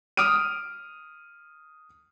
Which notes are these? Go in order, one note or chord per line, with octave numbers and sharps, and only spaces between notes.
D#6 F6 D7 D#7